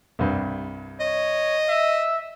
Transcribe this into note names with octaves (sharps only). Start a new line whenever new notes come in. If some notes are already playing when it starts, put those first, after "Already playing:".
C2 G2
C#5 D#5
E5